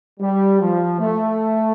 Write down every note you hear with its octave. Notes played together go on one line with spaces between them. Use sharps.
G3
F3
A3